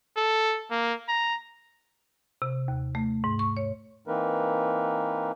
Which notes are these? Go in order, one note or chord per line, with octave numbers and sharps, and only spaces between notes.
A4
A#3
A#5
C3
D#2
A3
G#2
C#6
C#5
E3 A#3 C4 D#4 A#4 B4